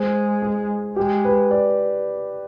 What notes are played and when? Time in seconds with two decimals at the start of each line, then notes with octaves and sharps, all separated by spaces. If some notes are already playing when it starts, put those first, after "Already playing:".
Already playing: G#3 C5
0.42 G#4
0.96 G#3 G4
1.25 B4
1.51 D5